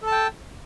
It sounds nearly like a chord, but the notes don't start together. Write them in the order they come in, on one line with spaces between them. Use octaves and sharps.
A4 A5 G5